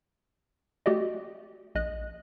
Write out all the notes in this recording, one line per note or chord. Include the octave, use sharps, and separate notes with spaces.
A3 F#4 G4 D5 D#5
A#1 D#5 F#6